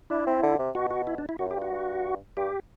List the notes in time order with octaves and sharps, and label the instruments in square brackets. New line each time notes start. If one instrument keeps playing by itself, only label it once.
[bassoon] D4 [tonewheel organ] E4
[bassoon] C4
D3
C3
[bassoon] B2 [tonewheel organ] F#4
[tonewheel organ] F#4
E4
D4
E4
[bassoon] F#2 [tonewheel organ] F#4
[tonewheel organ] G4
[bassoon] G2
[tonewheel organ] F#4
[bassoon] G2
[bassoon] G2 [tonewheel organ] G4